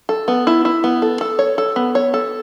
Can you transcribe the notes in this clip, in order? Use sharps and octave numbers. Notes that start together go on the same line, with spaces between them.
A4
B3
E4
E4
B3
A4
A4
C#5
A4
B3
C#5
A4